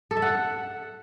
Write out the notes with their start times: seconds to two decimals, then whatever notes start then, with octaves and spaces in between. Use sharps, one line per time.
0.11 A4
0.17 E5
0.22 F#5